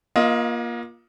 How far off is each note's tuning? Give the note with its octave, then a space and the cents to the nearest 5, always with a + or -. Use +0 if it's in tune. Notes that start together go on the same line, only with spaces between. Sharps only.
A#3 +30 F4 +0 D#5 +15